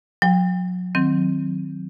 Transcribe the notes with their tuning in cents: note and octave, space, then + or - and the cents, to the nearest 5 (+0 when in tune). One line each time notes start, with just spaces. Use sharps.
F#3 -35 G5 +30
D#3 +0 F#3 +0 C4 +0